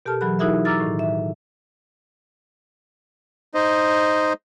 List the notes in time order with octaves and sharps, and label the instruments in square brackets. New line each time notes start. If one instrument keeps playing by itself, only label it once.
[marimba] B2 G4 A4 A#4 A5 F6
E3 F#3 G#4 B5 F#6
D#4 E4 F#4 G#4 A#4 E5
A#5 D6 E6 F6 A6
A2 D#3
E5
[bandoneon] D#4 C5 D#5